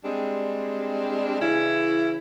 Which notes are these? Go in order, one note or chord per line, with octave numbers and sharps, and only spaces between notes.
G3 G#3 C4 D4
C#3 E3 C#4 E4